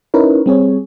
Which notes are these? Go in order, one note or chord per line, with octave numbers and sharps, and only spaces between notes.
C#4 D#4 E4 A#4 B4 C#5
G3 C4 G#4 C#5